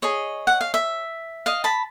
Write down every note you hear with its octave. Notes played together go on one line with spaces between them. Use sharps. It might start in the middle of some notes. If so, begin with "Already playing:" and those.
G#4 C#5 D#5
F#5
F5
E5
D#5 F5
A5 B5